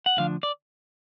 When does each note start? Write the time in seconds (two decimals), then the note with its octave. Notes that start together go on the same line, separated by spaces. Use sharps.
0.06 F#5
0.17 D2 D3 F3 D4 F5
0.43 D5